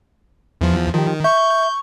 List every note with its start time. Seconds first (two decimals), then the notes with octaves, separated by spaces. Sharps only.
0.61 E2 F3
0.94 D#3 F3 G4
1.24 E5 C#6 G6